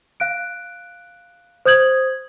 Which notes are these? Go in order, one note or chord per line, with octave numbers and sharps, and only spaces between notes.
F5 F#6 D7
C5 D#6 G6 G#6 F#7